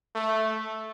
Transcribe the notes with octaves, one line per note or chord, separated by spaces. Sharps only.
A3